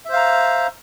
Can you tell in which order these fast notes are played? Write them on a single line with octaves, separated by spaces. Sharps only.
E5 C5 F5 A#5